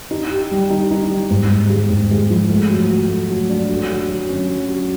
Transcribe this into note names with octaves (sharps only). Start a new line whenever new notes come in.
D#4
G4
G3
D#4
D#4
G3
G#2
G#2
G#3
G#2
G#3
F3
A3
F#3
F#3
A3
F#3
D4
F#3
F#3
F#3
C#4
F#3
F#3